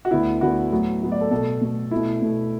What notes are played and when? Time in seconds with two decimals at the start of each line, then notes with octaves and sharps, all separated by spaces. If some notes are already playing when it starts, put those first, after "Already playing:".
0.05 F#4
0.11 D2 D3 B3 E4
0.41 D2 D3 B3 F#4
0.72 A2 F#3 B3
1.02 A2 F#3 B3
1.12 D5
1.21 A4
1.31 B2 A3 A4
1.61 B2 A3
1.91 B2 A3 E4
2.22 B2 A3